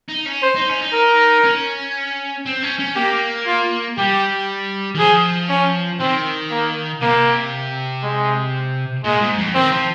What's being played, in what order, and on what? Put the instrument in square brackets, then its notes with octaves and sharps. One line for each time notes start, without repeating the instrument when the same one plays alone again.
[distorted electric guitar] D#4
C#4
[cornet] C5
[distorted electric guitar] D#4
C#4
D#4
[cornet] A#4
[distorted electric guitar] C#4
C4
C#4
C#4
[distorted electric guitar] A#3 [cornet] G4
[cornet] F4
[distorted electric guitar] G3 [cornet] G4
[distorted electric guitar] D#3
[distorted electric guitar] F3 [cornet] G#4
[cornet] C#4
[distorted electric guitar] D#3 [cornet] C4
[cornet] A#3
[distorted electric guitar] C3 [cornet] A#3
[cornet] G#3
[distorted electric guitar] A#2 [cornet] G#3
[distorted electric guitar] G#2
F2
[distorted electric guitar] D#3 [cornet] C4
[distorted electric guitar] F3